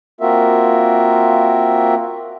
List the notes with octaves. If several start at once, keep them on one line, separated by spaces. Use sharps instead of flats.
A#3 C4 F4 F#4 A#4 E5